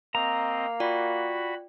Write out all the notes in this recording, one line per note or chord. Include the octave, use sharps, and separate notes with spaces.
A#3 C4 D#5 A#5
F4 F#4 D5 G5 B5